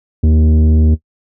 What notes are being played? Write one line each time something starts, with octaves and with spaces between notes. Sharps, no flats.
D#2